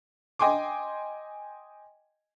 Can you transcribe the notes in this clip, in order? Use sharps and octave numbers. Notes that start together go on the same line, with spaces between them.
D#5 G5 G#5 C6 D6